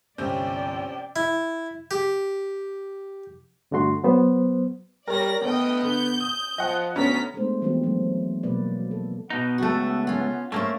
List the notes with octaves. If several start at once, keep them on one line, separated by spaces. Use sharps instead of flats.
G1 C2 C3 C4 C#4 D5 G5 G6
E4
G4
G2 D3 A3 F#4 C6
F#3 B3 C5
G3 A#4 C#5 D5 A#6
D2 A3 B3 D#5 G5
D3 G6
D#6
F3 D#5 F#5
D2 B3 C#4 A#5 B6
G#3 A3 B3 D4 C5
E3 F3 G3 B3 C4 F#4
F#3 A3
B2 F#3 A#3 B4 D5
A4
B2 B3 D#4
C#2 A3 F#4 A4
C#4 F4
A3 A#3 C#4 C5 E5